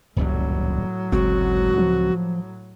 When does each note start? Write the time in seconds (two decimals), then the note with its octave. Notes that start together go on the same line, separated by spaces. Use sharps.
0.17 D#1 C#2 F#2 A2 F#3 G3
1.12 G1 C#2 G#3 C4 F#4
1.78 F3